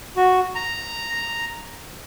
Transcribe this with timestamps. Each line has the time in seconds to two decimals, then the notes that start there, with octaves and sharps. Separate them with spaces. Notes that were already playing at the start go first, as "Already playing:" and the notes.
0.16 F#4
0.55 A#5